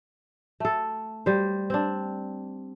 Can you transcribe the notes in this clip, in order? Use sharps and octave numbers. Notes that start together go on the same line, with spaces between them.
A3 A4
G3 C5
C4 D4